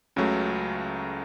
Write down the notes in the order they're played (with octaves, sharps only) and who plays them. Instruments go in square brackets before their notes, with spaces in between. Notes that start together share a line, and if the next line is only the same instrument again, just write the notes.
[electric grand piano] C#2 C#3 F#3 A3